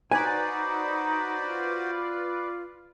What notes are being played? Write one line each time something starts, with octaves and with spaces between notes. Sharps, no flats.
D#4 F#4 B4 C5 D5 G#5
F4